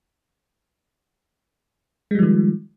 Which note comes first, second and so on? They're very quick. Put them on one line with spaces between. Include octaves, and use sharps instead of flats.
G#3 G3 F3 D#3